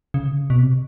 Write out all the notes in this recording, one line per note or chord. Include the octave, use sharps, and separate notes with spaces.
C#3
B2
C3